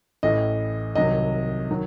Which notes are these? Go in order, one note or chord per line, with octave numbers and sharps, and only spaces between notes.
A1 A2 E3 D#5
C2 C3 D#3 F#3 D#5
D#3 F#3